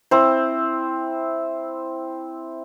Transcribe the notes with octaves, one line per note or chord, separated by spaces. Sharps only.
C4 E4 C5